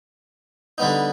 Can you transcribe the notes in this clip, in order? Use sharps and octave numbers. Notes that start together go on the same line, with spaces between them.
D3 G3 B3 D#4